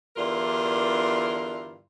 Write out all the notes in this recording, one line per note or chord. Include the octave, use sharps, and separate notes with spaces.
E2 G2 D3 E4 F4 A#4